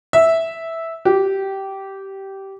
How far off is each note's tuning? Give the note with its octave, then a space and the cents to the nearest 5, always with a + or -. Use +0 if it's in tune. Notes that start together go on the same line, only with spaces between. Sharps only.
E5 -5
G4 -15